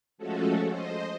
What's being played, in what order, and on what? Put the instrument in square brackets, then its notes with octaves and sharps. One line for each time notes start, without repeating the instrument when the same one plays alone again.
[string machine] F3 G#3 A3 C#4 F#4 A4
C5 D#5